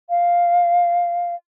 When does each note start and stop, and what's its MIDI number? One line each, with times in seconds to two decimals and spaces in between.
0.10 1.35 77